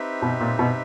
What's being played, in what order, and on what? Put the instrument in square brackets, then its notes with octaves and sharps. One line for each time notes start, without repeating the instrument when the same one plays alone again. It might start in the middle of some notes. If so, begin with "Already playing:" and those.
Already playing: [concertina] C4 D#4 G4 B4 E5
[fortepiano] B2
A#2
B2